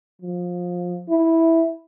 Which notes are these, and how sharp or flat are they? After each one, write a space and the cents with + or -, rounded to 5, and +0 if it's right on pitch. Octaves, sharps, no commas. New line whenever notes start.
F3 +20
E4 -10